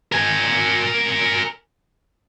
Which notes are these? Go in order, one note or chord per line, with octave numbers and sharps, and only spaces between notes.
A#4 G#5